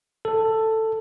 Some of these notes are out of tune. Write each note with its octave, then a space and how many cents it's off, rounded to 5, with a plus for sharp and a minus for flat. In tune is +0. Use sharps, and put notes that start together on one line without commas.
A4 +10